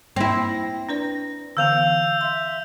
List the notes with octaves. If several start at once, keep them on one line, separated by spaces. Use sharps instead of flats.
A#3 C4 E4 A#6
D4 B4 D5
D3 E3 B3 F5 E6 G6 F7
E5 C6